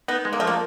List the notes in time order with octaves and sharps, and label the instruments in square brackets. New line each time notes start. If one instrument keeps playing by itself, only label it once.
[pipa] B3 [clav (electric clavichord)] D#4
[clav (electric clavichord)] G#3
[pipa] A#3
[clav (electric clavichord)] F3 [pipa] A3
[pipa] A#3